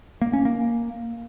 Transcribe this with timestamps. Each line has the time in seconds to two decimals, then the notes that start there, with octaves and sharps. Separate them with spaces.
0.21 A#3
0.33 C#4
0.45 A#3